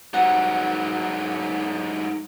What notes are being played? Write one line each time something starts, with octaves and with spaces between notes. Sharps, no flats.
G#2 F#3 F#5